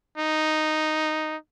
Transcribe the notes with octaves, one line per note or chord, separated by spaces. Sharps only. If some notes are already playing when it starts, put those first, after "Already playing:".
D#4